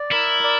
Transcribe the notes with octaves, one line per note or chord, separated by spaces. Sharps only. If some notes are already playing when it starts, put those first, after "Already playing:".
Already playing: D5
E4 A#4
D5